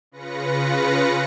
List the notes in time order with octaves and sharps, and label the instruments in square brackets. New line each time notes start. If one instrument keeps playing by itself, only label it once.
[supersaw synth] C#3 F4 B4 A#6 C#7